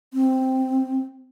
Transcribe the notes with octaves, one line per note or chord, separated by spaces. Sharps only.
C4